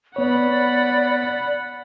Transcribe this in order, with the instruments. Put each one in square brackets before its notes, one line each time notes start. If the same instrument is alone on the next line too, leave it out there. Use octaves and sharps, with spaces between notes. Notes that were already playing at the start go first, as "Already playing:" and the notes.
[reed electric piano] B3 C#5 [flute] D5 [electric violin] F#5 B5